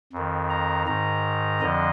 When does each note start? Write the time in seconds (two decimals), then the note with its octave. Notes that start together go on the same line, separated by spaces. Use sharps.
0.13 F2 D#3
0.50 A#5
0.87 G#2 D#3 A#5
1.61 F2 D3 F3 D#5